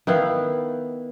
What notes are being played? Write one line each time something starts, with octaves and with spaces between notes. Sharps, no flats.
D#3 B3 E4 F5